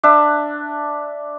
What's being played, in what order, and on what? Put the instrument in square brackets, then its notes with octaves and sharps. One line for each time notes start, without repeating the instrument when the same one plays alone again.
[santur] D4 E5